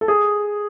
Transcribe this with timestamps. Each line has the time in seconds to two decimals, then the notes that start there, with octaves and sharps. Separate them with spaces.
0.01 A4
0.08 G#4